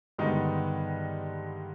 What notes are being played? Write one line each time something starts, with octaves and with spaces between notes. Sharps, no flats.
G2 D3 D#3 G#3 B3 D#4